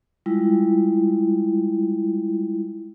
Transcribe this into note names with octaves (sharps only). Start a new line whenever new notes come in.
G3 G#3 E4 F4